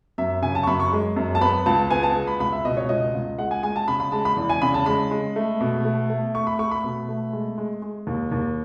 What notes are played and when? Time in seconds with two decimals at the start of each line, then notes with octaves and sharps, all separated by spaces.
0.18 F#2 E5
0.42 C#3 G#5
0.55 A5
0.63 C#6
0.67 F#2 B5
0.80 C#6
0.92 G#3
1.16 F#2
1.35 A5
1.41 B3 B5
1.66 C#2 A5
1.91 B3 G#5
2.03 A5
2.16 G#3
2.27 B5
2.40 C#2 B5
2.52 E5
2.65 B2 D#5
2.77 C#5
2.89 C#2 D#5
3.14 C#2
3.39 G#3 F#5
3.51 G#5
3.63 G#3 G#5
3.76 A5
3.88 C#3 B5
4.00 B5
4.12 G#3 A5
4.25 B5
4.37 E2
4.50 G#5
4.62 C#3 B5
4.74 A5
4.86 G#3 B5
5.11 G#3
5.36 A3
5.61 B2
5.85 A3
6.10 A3
6.34 A3 C#6
6.47 B5
6.59 A3 C#6
6.71 B5
6.84 B2
7.08 A3
7.33 G#3
7.58 G#3
7.82 G#3
8.07 D#2
8.32 D#2